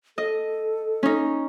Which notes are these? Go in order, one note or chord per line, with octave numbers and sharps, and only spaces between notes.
A4 D#5
C#4 D#4